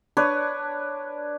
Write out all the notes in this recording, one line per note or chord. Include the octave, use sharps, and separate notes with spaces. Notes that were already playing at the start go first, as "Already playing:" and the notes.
D4 B4 C#5